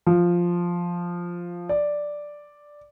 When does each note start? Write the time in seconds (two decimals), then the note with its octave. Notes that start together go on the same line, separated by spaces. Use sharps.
0.06 F3
1.69 D5